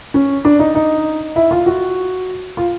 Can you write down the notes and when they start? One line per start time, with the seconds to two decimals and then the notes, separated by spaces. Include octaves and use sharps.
0.14 C#4
0.45 D4
0.59 D#4
0.75 D#4
1.36 E4
1.51 F4
1.66 F#4
2.57 F4